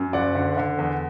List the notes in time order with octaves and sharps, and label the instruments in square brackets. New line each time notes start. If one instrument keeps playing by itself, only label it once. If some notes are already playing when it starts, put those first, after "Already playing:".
Already playing: [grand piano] F#2
F#1 D5 F#5
D3
D3
E2